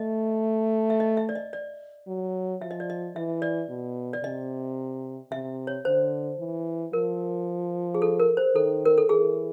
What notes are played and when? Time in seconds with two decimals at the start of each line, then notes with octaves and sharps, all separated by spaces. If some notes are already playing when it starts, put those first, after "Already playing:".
Already playing: A3 D#5
0.90 E5
1.00 D#5
1.17 E5
1.29 D5
1.35 D#5
1.53 D5
2.07 F#3
2.61 F3 E5
2.71 D#5
2.80 D5
2.90 D#5
3.15 E3 E5
3.42 D5
3.69 B2
4.13 D5
4.23 C3 D#5
5.31 C3 E5
5.67 C#5
5.85 D3 C5
6.39 E3
6.93 F3 A#4
7.95 G#4
8.02 A4
8.20 A#4
8.37 C5
8.55 D#3 A4
8.85 A#4
8.98 A4
9.09 E3 G#4